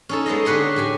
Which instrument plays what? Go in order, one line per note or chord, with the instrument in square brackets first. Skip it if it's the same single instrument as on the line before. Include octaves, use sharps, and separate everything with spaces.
[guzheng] C#4 D#4 A4
G#3 B3 A4 C5 D#5
D3 G4 G#4 B4 C#5 C6
A2 G4 G#5